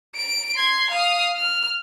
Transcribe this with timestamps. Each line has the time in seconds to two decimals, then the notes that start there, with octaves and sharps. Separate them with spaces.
0.16 D7
0.56 C6 G#6
0.90 F5 D#6
1.36 F6